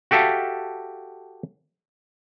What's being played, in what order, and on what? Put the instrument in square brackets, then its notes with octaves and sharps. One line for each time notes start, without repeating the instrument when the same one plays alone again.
[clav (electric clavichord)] F#4 G4 A4 E5 F5 A5